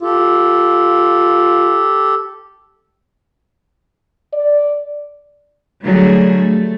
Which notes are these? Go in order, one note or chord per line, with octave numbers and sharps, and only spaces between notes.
F4 G4 A4
D5
D3 F#3 G3 A3 G#4
A3